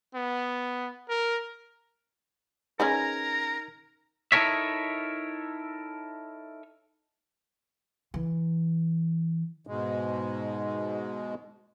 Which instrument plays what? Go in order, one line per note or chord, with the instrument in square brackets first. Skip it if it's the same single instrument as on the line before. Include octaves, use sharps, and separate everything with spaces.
[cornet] B3
A#4
[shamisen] C#4 G#4 B4 [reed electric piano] D#4 G#6 [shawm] A#4 [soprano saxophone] A#5
[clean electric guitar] D#4 E4 A4 A#4 C#5 E5
[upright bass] E3
[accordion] G#2 B2 G#3